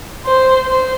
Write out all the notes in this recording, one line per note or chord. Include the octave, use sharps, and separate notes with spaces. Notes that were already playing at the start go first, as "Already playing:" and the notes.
C5
C5